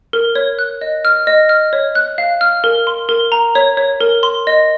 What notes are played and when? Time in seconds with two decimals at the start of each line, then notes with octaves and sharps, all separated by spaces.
0.13 A#4
0.35 C#5
0.59 F#6
0.81 D#5
1.05 F6
1.27 D#5
1.49 F6
1.73 C#5
1.95 F#6
2.18 F5
2.41 F6
2.64 A#4
2.87 C6
3.09 A#4
3.32 A#5
3.55 C#5
3.77 C#5
4.01 A#4
4.23 C6
4.47 D#5